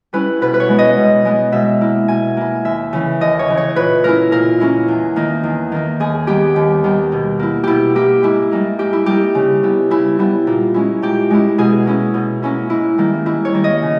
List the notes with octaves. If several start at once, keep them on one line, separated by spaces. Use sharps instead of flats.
G3 C#4 E4 B4
B2 B4
B4
C#5
G#3 B3
D#5
B2
G#3 B3
B2 E5
A#3 E4
B2 G#5
A#3 E4
D#2 E5
C#3 E3
D#2 D#5
C#5
C#3 E3
C#5
A#2 B4
A#3 C#4 E4 A#4
A#2 A#4
A#3 C#4 E4
E2
D#3 A#3 D#4
E2
D#3 A#3 D#4
D#2 G#4
D#3 G3 B3 G4
D#2
D#3 G3 B3
B2
A#3 E4
B2 E4 G4
A#3 E4 G4
G#2 E4
G3 A#3 D#4
G#2 G4
E4
G3 A#3 D#4 G4
C#3
G3 B3 E4
C#3 E4
G3 B3 E4
A#2
G#3 C#4 E4
A#2 G4
G#3 C#4 E4
B2 G#4
A#3 C#4 E4
B2
A#3 C#4 E4
G#2 E4
D#3 G3 A#3
G#2 E4
C#5
D#3 G3 A#3
D#5
C#3